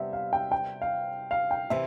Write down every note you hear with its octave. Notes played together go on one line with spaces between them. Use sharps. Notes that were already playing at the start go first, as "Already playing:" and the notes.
Already playing: C3 G3 B3 E5
F5
G5
G5
F5
F5
G5
C3 E3 E5